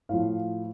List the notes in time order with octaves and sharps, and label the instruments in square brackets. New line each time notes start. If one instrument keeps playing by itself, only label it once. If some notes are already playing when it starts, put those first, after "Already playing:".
[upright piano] A2 F3 F5